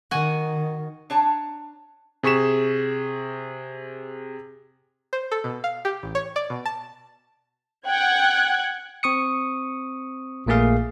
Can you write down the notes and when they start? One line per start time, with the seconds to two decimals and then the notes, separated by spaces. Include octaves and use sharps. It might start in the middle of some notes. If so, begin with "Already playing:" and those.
0.11 D#3 F#4 G#5
1.10 D4 C#5 A5 A#5
2.23 C3 G#4 C#6 B6 E7
5.13 C5
5.31 A4
5.44 B2
5.64 F5
5.85 G4
6.03 A1
6.15 C#5
6.36 D5
6.50 B2
6.66 A5
7.88 F#5 G5 F#6 G#6
9.03 C4 C#6 D#6 C#7
10.46 A#1 A#2 A3 A#3 G#4 F5